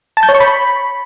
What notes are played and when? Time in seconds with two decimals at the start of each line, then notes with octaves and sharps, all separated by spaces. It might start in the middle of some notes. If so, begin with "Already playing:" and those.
0.17 A5
0.23 G6
0.29 C#5
0.35 C#6
0.40 B5